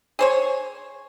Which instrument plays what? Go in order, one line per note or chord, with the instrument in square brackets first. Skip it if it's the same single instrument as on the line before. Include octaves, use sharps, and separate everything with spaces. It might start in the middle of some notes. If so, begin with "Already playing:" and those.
[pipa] G#4 C5 C#5